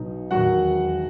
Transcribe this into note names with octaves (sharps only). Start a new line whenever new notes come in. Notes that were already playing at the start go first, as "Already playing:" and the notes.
Already playing: B1 B2 F#3 D#4
E1 D#2 D#3 F#3 F#4 F#5